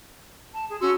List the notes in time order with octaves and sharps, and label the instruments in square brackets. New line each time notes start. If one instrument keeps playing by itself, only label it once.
[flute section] A5
G#4
[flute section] C#4 C6 E6 [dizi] F#4